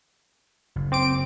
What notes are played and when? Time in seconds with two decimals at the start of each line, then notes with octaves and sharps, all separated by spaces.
0.76 F#1
0.92 C4 D6 D7